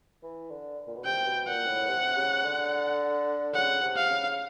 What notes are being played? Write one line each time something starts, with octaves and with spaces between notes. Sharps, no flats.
E3
D3
A#2
B2
C3 G5
B2
A#2 F#5
A2
C3
C#3
D3
C#3 F#5
C3
F5
C#3